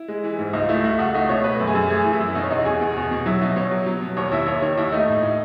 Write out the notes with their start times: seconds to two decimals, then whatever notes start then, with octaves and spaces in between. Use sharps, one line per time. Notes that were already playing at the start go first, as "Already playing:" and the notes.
Already playing: E4
0.08 G#3
0.24 E3
0.39 G#2
0.53 C#2 D#4 D#5
0.69 A3 E4 E5
0.84 C#2 F#4 F#5
0.99 C#2 F#4 F#5
1.14 A3 D#4 D#5
1.29 B2 C#5
1.44 A3 B4
1.60 F#2
1.67 G#4 G#5
1.75 F#2
1.90 A3 G#4 G#5
2.05 E3
2.13 E4 E5
2.20 F#2
2.35 B2 D#4 D#5
2.43 C#5
2.50 E2 D#4 D#5
2.65 B2 G#4 G#5
2.81 E2
2.96 B2
3.11 B2
3.26 F#3 E4 E5
3.41 B2 D#4 D#5
3.56 B2 C#5
3.71 F#3
3.86 F#3
4.02 B2
4.17 D#2 C#5
4.32 D#2 E4 E5
4.47 D#2 C#5
4.62 D#3 C#5
4.77 D#2 E4 E5
4.92 A3 D#4 D#5
5.07 A2
5.23 A2